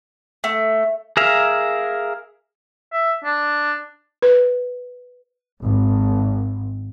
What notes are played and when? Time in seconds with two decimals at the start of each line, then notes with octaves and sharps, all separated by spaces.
0.44 A3
1.17 G#4 A#4 E5 F5
2.93 E5
3.25 D4
4.22 B4
5.61 G#1